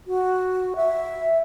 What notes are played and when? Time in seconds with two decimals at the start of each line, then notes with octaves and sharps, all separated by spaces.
0.07 F#4
0.76 E5